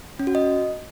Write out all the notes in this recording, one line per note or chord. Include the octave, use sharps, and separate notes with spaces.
C#4
F#4
D#5